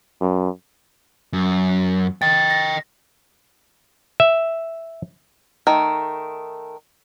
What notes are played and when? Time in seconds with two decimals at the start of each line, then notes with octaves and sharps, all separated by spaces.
0.21 F#2
1.33 F#2
2.22 D#5 G5 A6
2.50 A#6
4.20 E5
5.67 D#3 A3